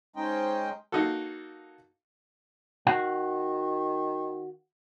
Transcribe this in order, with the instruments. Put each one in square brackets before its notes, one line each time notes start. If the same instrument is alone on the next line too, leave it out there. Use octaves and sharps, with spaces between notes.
[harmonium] G#3 C#4 D#4 C5 D#5 G5
[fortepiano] A#3 D#4 F4 F#4 A4
[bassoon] D#3 [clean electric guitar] F#4 F5 F#5